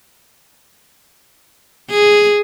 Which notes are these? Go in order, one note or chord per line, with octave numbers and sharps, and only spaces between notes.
G#4